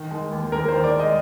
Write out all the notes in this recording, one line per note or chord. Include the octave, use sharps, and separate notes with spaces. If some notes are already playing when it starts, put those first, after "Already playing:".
Already playing: D#3
G#3
D#2
D#2 A#4
D#3 C5
D5
G#3
D#5